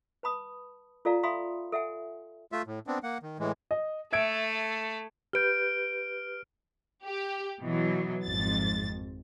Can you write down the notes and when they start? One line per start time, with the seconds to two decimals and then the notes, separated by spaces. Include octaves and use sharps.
0.23 B4 A5 B5 D#6
1.05 F4 A4 D5 F5 A#5
1.23 E5 F5 G#5 B5 C6 D#6
1.72 A4 E5 F#5 G#5
2.52 A3 F4 E5
2.67 A2
2.87 B3 C4 D4
3.03 A#3 F#5
3.23 D#3
3.39 A2 E3 G#3
3.71 D#5
4.13 A3 A4 E5 G#6 D7
5.33 G4 B4 F6 G6 D7
7.04 G4
7.62 B2 E3 F#3
8.25 G#1 F2 A6